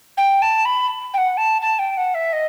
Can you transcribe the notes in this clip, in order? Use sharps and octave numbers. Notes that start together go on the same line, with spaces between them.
G5
A5
B5
G5
F#5
A5
A5
G5
F#5
E5
D#5